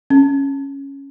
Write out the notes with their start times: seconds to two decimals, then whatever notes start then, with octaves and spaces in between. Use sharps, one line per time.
0.10 C#4